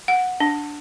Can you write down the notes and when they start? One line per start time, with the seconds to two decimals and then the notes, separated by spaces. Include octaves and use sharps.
0.08 F#5
0.40 D4